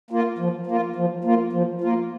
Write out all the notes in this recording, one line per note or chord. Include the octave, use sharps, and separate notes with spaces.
A#3 F4
F3
A#3 F4
F3
A#3 F4
F3
A#3 F4